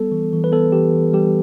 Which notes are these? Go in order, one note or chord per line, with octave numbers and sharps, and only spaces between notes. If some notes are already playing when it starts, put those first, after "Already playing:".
Already playing: G3 B3 A4
E3
E3
B4
B3 A4
E3 G4
E3
G3 G4